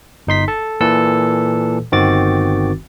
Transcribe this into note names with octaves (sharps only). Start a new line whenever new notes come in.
G1 D#4 C6 B6
A4 A5
A#2 E3 A4 B4 E6
G1 D#3 C4 F#4 D6 A6